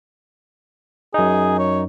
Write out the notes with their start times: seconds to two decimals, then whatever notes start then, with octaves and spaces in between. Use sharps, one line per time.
1.14 F#2 D#4 G#4
1.58 C#5